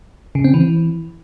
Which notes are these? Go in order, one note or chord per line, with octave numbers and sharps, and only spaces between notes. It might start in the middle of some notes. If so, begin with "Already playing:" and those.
C#3
C4
E3